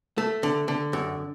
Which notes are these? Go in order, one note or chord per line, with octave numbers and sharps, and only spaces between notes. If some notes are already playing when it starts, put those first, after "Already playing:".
A3
D3
D3
F#2